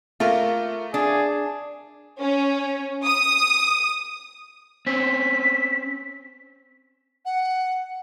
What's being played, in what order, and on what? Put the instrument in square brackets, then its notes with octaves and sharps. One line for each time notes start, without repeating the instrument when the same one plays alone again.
[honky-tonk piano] A3 A#3 [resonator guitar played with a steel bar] F4 A#4
[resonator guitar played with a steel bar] D4 [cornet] G#4
[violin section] C#4
D#6
[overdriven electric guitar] C4 C#4 [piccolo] B6
[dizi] F#5